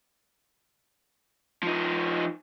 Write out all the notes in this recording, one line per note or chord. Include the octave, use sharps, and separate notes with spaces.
F3 D#4